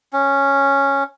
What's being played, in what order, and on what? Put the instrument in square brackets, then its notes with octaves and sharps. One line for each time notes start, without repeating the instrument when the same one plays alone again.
[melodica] C#4